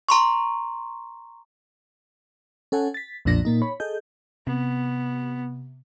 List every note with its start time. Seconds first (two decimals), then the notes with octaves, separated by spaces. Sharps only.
0.09 A#5 C6 C#6
2.72 C#4 A4 F#5 G#5
2.94 A6 B6
3.25 B1 F2 A#2 F3 D4 A#6
3.45 A#2 A#3 D#4
3.62 C#5 B5
3.80 G#4 A4 D#5 G6
4.47 C3 B3